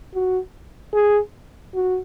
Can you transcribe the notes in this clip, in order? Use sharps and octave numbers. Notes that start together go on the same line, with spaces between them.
F#4
G#4
F#4